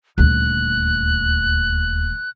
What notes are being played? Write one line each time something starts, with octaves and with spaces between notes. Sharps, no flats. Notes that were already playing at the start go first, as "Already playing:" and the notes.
D#1 D2 F#6